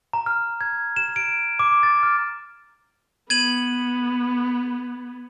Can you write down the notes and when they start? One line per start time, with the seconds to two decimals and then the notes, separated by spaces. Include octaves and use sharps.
0.13 A#5
0.26 F6
0.61 G#6
0.96 E7
1.16 D7
1.59 D6
1.83 A6
2.03 F6
3.30 B3 G#6 D#7 F#7